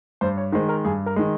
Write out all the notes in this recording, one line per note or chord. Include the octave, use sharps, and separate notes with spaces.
G2 C5
C#5
D#3 G#3 C5
A#4
G2 G#4
A#4
D#3 G#3